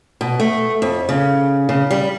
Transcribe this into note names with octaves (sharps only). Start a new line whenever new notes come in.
B2
A3
F2
C#3
C#3
G3